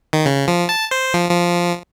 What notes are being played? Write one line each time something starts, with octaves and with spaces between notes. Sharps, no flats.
D#3
C#3
F3
A5
C5
F3
F3